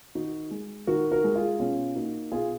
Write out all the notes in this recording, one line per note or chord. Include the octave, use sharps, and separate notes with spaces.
D#3 D#4 F#4
G#3
D#3 F#4 A#4
F#4 A#4
G#3
F4 G#4
B2 C#4 F4
A#3 D#4 F#4
B2 F4 G#4